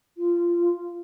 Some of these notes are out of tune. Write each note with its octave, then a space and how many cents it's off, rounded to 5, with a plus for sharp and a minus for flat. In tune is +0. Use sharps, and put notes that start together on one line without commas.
F4 -15